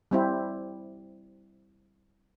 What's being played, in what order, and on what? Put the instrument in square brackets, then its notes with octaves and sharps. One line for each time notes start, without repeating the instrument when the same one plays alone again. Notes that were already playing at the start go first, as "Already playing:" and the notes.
[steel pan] G3 C4 E4